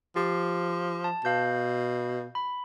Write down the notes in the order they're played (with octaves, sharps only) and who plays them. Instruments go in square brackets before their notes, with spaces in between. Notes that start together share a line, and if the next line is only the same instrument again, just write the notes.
[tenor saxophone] F3 [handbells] G4
[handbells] A5
[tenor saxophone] B2 [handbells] F5 G6
[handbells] B5